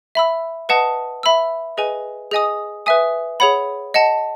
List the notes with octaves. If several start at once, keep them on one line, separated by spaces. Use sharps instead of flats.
E5 B5 E6
B4 D#5 F#5 A5 D#6
E5 B5 E6
G#4 B4 D#5 G#5
G#4 D#5 G#5 D#6
B4 E5 G#5 D#6
G#4 C#5 F#5 B5
D#5 F#5 A5